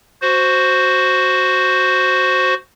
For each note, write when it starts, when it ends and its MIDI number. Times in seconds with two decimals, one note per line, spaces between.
0.22 2.54 66
0.22 2.54 72